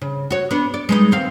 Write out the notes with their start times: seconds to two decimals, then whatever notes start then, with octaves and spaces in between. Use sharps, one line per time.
0.02 C#3
0.31 F#4 C#5
0.51 B3 D4
0.74 D5
0.89 G#3 B3 D#4
1.11 D#2 C4 F5